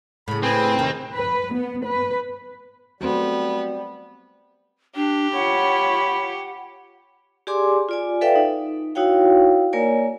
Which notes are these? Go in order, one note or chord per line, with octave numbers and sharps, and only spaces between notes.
A2 C#3 B5
C4 G#4 B4 G#5
D#2 C3 D#3
B4
B3
B4
F#3 G3 A3 B3 C4
D4 G4
F4 C#5 F#5 B5
G4 G#4 D5 G#5 C6 D6
F4 D5 G#5
A4 B4 D5 E5 F5 G5
D#4
D#4 E4 F#4 C#5 F5 G5
A#3 A#4 C#5 D5 G#5